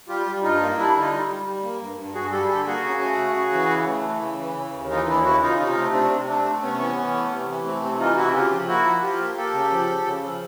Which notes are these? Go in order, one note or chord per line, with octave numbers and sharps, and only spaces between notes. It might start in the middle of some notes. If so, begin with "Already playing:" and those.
G3 F4 G4
G3
G2 D#4 F4
A#3
G3 D4 E4
D3
D#4 F4
G3
G3
G3
A#3
G2
G2
G2 F#4 G#4
G3 G4 A4
G#4
D3 G4 A4
A#3 F#4 G#4
C#3
A3
C#3
C#3
E3
C#3
A3
E3
C#3
E3
C#3
D#2
E3 D#4 F4
D#2 D4 E4
C#3 E4 F#4
C#3 D#4 F4
C3 D#4 F4
A3
C3 C4 D4
C3
A3 C4 D4
A3
C3 B3 C#4
E3
E3
A3
C3
E3
A3 C4
C3 C4
E3 D#4 F4
C3 E4 F#4
C#3 F4 G4
F3
A#3 E4 F#4
F3
F3 F4 G4
A#3
A#3 G4 A4
C#3
F3
C#3
C#3
F3